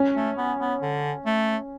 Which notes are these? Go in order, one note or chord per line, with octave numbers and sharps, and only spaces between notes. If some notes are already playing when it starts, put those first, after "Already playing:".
Already playing: C#4
A3
B3
B3
D3
A3